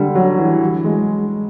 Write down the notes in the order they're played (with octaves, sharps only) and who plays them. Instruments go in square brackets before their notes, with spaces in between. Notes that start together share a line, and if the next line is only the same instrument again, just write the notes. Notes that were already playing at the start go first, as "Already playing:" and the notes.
Already playing: [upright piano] D3 G3
F#3
E3
G#3